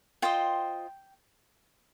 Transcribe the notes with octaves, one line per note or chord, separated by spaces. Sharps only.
F4 C5 D#5 G5